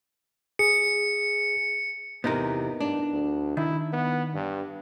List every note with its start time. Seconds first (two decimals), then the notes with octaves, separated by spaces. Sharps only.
0.59 G#4 C#7
2.24 E2 C3 B3 D#4 A#4
2.80 G2 D4
3.12 D2
3.57 D#3 E4
3.93 B3
4.34 G2